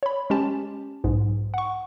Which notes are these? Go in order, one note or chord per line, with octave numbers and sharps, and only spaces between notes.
C#5 B5
G#3 C#4 G4 A5
B1 G#2
F#5 C#6